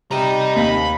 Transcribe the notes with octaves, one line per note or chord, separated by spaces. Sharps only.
C3 G3 D#5 A#5
D#2 B5